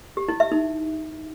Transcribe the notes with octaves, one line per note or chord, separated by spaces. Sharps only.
G4
E4
E5
D#4